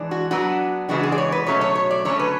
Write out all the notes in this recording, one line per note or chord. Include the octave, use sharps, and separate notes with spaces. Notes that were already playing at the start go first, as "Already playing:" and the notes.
Already playing: E3 G#3 D4
F#4
F#3 B3 D4 F#4
C#3 E3 G#3 B3 D4 F#4
G#4
D5
C#5
B4
B2 F#3 A3 C#4 C#5
C#5
C#5
D5
D3 F#3 A3 C#4 C#5
B4